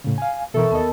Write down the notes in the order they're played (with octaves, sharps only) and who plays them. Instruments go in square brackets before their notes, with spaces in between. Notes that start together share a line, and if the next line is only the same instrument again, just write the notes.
[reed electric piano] A2 C#3
F5 G#5
[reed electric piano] B2 E3 A#4 [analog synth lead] A4 [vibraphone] E5 C#6
[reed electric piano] D#2 D#5 [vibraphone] B3 A#4 A5